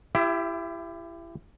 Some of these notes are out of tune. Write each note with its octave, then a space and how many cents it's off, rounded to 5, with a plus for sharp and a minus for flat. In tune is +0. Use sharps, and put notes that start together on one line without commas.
E4 +30 G4 +10 E5 +0